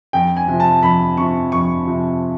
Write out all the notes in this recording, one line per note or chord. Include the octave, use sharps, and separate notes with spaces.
F2 G5
G#5
C3 F3
A5
F2 B5
C3 F3 C#6
F2 C#6
C3 F3